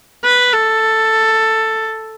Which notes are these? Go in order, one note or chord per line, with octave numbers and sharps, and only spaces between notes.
B4
A4